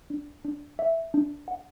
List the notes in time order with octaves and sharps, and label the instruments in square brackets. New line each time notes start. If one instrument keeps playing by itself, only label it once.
[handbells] D4
D4
E5
D4
F#5